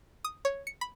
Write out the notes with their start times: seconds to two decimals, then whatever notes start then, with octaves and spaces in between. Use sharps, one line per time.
0.25 D#6
0.45 C#5
0.67 C#7
0.81 B5